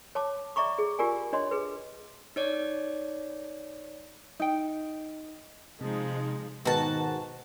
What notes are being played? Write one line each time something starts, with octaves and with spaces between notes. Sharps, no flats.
C#5 A5 D6
D5 E5 A#5 C#6 D6
G#4
F4 G4 A#4 D5 G#5
D4 C#5 D#5 C6
G#4 B4
D#4 C#5 D5
D#4 G5
C3 F3 G#3 D#4
G#2 B2 D#3 F#4 A5